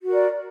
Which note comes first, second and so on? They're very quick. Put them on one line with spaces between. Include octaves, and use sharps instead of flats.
F#4 A#4 D5